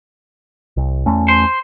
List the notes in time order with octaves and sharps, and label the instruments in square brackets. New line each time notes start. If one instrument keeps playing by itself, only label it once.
[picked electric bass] C2
E2 A3 C#4
[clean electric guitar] C5